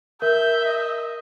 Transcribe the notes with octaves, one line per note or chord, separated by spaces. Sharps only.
A#4 E5 G6
D#5